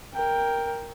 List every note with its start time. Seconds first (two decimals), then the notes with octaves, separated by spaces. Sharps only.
0.14 A#4 G5